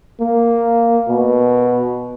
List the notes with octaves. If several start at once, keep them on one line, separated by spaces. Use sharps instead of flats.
A#3
B2